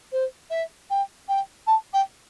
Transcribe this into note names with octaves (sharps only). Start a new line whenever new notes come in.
C5
E5
G5
G5
A5
G5